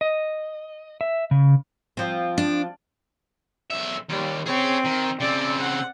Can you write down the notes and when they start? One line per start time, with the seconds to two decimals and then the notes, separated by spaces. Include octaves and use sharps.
0.01 D#5
1.01 E5
1.31 C#3
1.97 F3 C4
2.38 D4
3.71 B1 E5
4.09 D#2 G3
4.46 C4 G#4 C#5
4.85 D#3
5.20 C#3 C4 D5
5.60 F#5